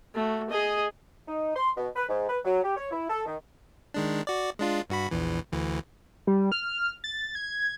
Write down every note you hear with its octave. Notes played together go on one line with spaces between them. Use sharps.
A3 F#4
G#4 D#5
D#4
C6
B2
B4
G#2
B4
F#3
G4
C#5
E4
A4
D#3
D#3 G#3 D4
F#4 D5
G#3 D4 F4
G2 F#4 B5
A#1 E2 E3
D2 E3
G3
F6
A6
G#6